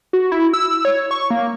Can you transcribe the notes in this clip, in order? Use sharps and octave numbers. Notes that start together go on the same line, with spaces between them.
F#4
E4
E6
C#5
C#6
A#3